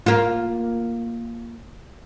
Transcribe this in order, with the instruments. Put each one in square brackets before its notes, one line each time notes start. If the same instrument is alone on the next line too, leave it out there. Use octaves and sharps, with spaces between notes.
[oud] A#3 F4